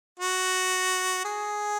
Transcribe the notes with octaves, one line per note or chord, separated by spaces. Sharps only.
F#4
G#4